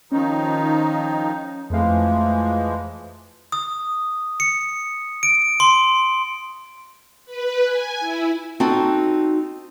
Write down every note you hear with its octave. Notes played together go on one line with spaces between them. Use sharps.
D#3 F3 C#4 D#4
F2 E3 F3 G#3 A3 F5
D#6
C#7
D7
C6
B4
G#5
E4
C4 D#4 F#4 A4